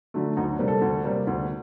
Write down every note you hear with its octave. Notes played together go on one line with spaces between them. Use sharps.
D3 F#3 A3
D2 D#4
D4
C3 G3 A#3
A4
D2
C3 G3 A#3
D2